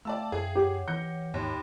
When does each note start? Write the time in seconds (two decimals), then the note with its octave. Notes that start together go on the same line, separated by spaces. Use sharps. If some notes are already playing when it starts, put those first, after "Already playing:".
0.05 A3 D5 E5 F5 G5 A5 E6
0.32 F#2 G#4
0.55 G4 C#5 F#5
0.88 E3 G6 A#6 C#7
1.34 D#2 G#2 B5